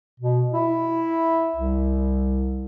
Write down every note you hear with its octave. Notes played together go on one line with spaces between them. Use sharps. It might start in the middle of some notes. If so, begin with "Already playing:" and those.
B2
E4
C2